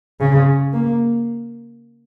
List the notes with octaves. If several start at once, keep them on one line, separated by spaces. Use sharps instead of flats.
C#3
A#3